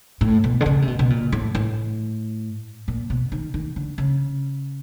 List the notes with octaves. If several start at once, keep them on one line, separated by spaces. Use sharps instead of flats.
A2
B2
D3
C#3
C3
B2
B2
A#2
A2
A2
A#2
B2
D#3
D#3
D3
C#3